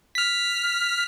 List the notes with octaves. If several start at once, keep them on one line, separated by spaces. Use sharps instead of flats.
F6 B6